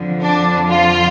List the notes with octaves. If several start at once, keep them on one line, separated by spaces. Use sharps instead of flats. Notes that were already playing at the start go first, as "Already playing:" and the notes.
Already playing: F2 D3 F3
D4
F4